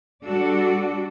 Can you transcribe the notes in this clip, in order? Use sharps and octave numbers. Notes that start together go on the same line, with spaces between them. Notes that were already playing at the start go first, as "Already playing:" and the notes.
G3 D4 F#4 A4 D5